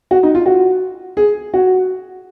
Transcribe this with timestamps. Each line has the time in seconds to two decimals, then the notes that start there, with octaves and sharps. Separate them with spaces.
0.11 F#4
0.23 D#4
0.35 F4
0.46 F#4
1.17 G#4
1.54 F#4